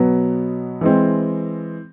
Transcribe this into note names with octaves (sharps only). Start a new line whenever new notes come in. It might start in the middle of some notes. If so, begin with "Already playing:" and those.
Already playing: B2 F#3 B3
E3 G#3 C4